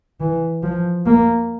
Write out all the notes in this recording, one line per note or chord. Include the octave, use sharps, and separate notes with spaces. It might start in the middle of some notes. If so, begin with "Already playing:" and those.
E3
F3
A#3